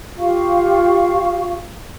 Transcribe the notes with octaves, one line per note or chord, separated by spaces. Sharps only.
F4 G4 F5 C#6